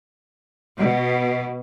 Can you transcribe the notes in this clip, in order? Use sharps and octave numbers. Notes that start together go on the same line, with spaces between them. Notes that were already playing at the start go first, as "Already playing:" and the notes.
B2